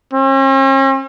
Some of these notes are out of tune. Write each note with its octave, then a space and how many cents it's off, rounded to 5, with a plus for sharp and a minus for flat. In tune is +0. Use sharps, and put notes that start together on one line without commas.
C#4 -45